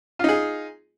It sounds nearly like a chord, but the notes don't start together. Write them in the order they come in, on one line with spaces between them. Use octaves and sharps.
F4 D#4 G#4